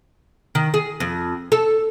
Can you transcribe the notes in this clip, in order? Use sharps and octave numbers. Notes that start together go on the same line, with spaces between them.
D#3
G#4
F2
A4